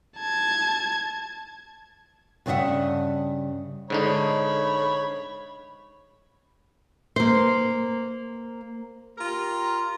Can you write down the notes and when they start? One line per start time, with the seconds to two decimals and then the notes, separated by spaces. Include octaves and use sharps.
0.19 A5 G#6
2.46 G2 C#3 D4 D#5 E5 F#5
3.90 G#2 D3 D#4 C#5 B5
7.16 A#3 C5
9.17 F4 G4 A#4 A#5